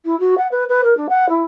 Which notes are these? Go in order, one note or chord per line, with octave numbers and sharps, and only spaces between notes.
E4
F#4
F#5
B4
B4
A#4
D4
F#5
E4